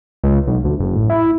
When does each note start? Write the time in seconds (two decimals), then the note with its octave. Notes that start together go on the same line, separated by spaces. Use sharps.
0.24 C#2
0.47 B1
0.64 D2
0.80 F#1
0.96 A1
1.10 E4